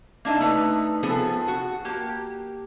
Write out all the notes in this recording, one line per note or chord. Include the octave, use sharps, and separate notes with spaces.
A#3 D4 D#4 E5
A3 D#4 B4
F3 B3 C4 G#4 A4
F#4
A#3 G4